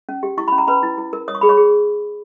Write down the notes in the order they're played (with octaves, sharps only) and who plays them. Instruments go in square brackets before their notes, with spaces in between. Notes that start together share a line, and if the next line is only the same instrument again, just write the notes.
[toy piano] C#4
G4
E4 C#6
C#4 B5
A#5
C#4 B4 B5
E4
E4
A#4
C#5 D#6
C#6
G#4 B5
C#5 C#6
G#4